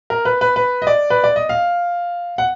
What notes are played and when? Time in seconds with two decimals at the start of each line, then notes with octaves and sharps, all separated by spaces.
0.10 A#4
0.25 B4
0.41 B4
0.56 B4
0.82 D#5
0.87 D5
1.10 B4
1.24 D5
1.36 D#5
1.49 F5
2.38 F#5